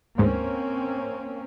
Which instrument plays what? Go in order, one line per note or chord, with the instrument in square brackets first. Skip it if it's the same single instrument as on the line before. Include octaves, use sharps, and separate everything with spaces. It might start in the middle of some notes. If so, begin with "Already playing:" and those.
[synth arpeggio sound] D2 G#2 [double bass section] A#3 C4 C#4